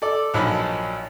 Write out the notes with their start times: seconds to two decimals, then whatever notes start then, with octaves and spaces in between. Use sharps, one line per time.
0.02 A4 D5
0.34 A#1 F3 F#3 D#4 B5